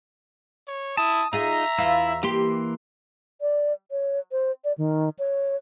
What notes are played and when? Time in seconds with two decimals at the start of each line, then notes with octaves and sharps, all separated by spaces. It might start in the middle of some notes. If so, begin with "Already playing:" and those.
0.67 C#5
0.97 E4 A5 D#6
1.33 D#4 F4 G#4 E5 A#5
1.78 E2 E4 F4
2.23 E3 A#3 G4 C6
3.41 D5
3.91 C#5
4.32 C5
4.64 D5
4.78 D#3
5.19 C#5